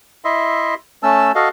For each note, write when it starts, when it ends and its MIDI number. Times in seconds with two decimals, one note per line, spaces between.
0.25 0.74 64
0.25 0.74 75
0.25 0.74 76
0.25 0.74 84
1.03 1.32 57
1.03 1.32 61
1.03 1.32 81
1.03 1.32 88
1.35 1.49 66
1.35 1.49 69
1.35 1.49 75
1.35 1.49 77